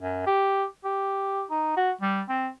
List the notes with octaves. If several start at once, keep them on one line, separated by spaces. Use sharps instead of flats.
F#2
G4
G4
D#4
F#4
G3
C4